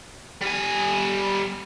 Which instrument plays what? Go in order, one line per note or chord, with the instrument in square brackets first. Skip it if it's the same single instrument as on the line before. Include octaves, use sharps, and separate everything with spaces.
[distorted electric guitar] G3 G#5